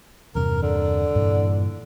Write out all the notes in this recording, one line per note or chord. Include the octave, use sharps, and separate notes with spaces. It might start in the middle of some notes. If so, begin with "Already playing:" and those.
E2 G2 C3 A#4
D3
G2 A#2 E3